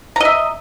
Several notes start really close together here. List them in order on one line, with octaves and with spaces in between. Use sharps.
A#5 D#5 E5